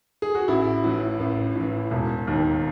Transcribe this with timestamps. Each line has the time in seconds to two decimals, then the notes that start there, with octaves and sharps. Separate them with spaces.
0.22 G#4
0.35 F#4
0.48 A1 E4
0.84 A2 E3
1.20 A1
1.55 A2 E3
1.91 E1
2.27 D#2 D#3